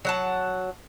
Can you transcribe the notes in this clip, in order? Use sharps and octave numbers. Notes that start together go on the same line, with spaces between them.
F#3 F#5 A5